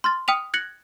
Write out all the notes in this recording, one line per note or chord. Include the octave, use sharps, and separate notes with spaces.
C6 F6 A6
G5 D#6 F6 B6 D#7 F7
F#6 G#6 A#6 C#7 F#7